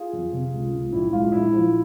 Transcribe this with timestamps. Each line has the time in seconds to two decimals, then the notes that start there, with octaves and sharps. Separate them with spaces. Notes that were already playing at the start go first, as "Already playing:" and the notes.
Already playing: F4 G#4
0.13 F2
0.33 C3
0.53 C#2
0.73 C#2
0.92 A#1 E4
1.13 G#3 F4
1.32 A#1 E4
1.53 F3